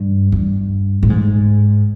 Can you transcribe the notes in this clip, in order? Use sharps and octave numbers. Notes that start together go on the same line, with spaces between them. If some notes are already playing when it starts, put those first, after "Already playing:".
Already playing: G2
G2
A2
G#2